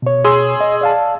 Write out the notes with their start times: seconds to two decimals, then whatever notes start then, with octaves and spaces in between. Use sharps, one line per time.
0.02 B2 C#5
0.25 G#4 C6 E6
0.61 D#5
0.81 D5 F5 A5